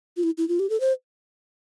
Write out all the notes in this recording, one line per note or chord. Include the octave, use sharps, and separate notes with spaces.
F4
E4
E4
F4
G4
A4
C5